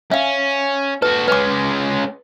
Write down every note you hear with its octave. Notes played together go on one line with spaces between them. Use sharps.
C#4 E5 F5
F#4 A4 B4
G#3 C#4 B4 D6